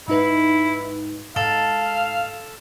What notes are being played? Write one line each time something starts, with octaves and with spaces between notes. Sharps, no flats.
G#2 D#4 E4 B4
G#2 A4 F5